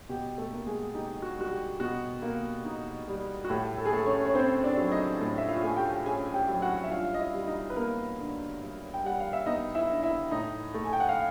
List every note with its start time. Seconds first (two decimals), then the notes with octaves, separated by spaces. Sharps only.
0.09 B2 G4
0.38 A3 A4
0.52 A#3
0.66 G#3 G#4
0.95 D#4 G4
1.22 F#4
1.37 G3 F#4
1.51 G4
1.80 B2 F#4
2.22 A#3
2.65 D#4
3.07 G3
3.45 F#4
3.50 A2 G4
3.78 A4
3.85 G#4
3.92 A3 A4
4.06 C#4 C#5
4.26 C#5
4.35 C4 C#4 C5
4.64 D4 D5
4.77 F#3
4.92 D#4 D#5
5.21 A2
5.38 E5
5.49 F4 F5
5.63 A3 G#5
5.77 G4 G5
6.05 C#4 G#4 G#5
6.34 G4 G5
6.49 F#3
6.62 F#4 F#5
6.84 E5
6.91 G2 F4 F5
7.14 D#5
7.19 E4 E5
7.33 G3
7.47 D#4 D#5
7.70 B4
7.76 A#3 B3 A#4
8.19 D3
8.61 G2
8.94 G5
9.04 G3 F#5
9.20 F5
9.33 E5
9.46 B3 D#4 D#5
9.75 E4 E5
9.89 D3
10.03 E4 E5
10.31 A2 D#4 D#5
10.74 A3
10.84 G#5
10.93 G5
11.00 F#5
11.09 F5